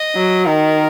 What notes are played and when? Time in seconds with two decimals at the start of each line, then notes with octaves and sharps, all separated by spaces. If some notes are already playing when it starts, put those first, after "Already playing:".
Already playing: D#5
0.16 F#3
0.47 D#3 A#4